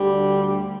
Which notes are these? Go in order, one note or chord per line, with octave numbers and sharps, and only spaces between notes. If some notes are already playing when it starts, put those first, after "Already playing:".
Already playing: D2 D3 G3